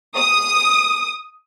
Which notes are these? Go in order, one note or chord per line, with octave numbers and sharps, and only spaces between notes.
D#6